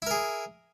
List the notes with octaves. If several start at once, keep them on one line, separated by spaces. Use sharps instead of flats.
E4 G#4 A#4